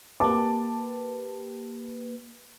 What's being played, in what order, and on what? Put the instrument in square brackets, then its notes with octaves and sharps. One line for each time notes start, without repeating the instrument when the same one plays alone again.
[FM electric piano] A#3 G4 B4 [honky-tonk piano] A5 D6